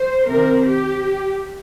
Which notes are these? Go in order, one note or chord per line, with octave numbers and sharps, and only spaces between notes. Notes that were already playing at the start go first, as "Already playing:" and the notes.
Already playing: C5
C3 D#3 C4 A#4
G4